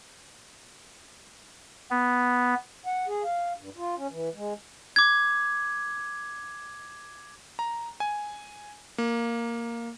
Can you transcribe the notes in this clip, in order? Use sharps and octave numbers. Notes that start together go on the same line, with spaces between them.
B3
F#5
G#4
F5
G2
F4
C#4
E3
G#3
D6 G#6
A#5
G#5
A#3